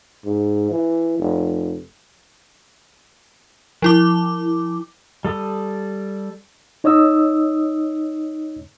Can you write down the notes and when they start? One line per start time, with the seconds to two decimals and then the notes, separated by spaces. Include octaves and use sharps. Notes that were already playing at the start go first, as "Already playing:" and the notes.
0.25 G#2
0.71 E3
1.19 F1
3.82 F3 E4 D6
5.25 G3 A4 D#6
6.84 D#4 C#5 D#5 D#6 E6